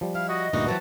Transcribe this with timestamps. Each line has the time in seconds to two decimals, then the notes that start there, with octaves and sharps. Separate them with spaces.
0.01 F3 G3
0.15 E4 F5
0.29 F#4 D#5
0.53 D2 G2 A#2 E3 D#4 F#4
0.67 E3 F#3 C4 B4 A5